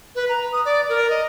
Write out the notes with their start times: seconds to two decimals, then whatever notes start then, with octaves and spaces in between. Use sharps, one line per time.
0.15 B4
0.29 A#5
0.52 D#6
0.65 D5
0.89 A#4
1.10 D#5